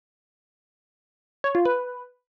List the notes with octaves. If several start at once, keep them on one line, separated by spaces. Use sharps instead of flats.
C#5
F4
B4